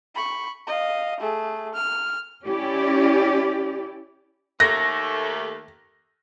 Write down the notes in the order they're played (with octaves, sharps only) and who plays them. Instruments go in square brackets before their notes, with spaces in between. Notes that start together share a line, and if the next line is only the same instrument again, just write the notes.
[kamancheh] B5 C#6
D#5 F5
A3 G#4
F6
[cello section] C#4 E4 G4 D5
[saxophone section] D#2 A3 [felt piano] A#6